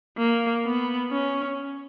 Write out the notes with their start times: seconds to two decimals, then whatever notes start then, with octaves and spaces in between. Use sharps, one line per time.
0.18 A#3
0.65 B3
1.12 C#4